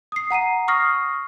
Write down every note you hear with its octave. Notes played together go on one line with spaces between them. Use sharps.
D#6 C7
F#5 A#5 C7 D#7
C#6 D#6 F6 A#6 C7